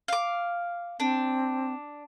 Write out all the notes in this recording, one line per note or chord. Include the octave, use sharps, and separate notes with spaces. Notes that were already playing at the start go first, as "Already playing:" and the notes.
F5 D6
C4 D4